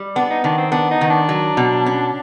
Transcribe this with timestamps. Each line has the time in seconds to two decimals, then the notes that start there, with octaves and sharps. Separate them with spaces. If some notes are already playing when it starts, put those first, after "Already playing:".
Already playing: G3
0.15 B3 D4
0.30 D#4
0.44 D#3 D4
0.58 C4
0.72 B3 D4
0.91 D#4
1.01 D#3
1.09 D4
1.29 F#3
1.57 B2
1.86 C#4